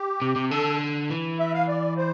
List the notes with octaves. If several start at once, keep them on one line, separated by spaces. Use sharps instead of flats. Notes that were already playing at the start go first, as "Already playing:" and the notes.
Already playing: G4
C3
C3
D3 A4
E3
E5
F5
D5
C5